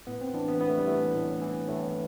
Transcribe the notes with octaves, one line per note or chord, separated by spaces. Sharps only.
A2 B3
C4
E3 D4
B3
A2 B3
A3
G3
E3 A3
A2
E3
A2 A3